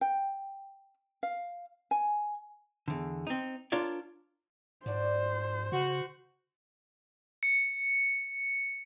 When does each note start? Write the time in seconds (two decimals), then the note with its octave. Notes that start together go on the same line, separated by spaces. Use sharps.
0.01 G5
1.23 F5
1.91 G#5
2.88 E2 D3
3.27 C4 D#4
3.72 D4 F4 A#4 C#5 D5
4.86 G#2 D4 F#4 C5 D5
5.72 C#3 F#4
7.43 C#7